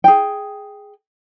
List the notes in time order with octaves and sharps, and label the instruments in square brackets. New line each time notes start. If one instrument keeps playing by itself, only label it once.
[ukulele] G#4 G5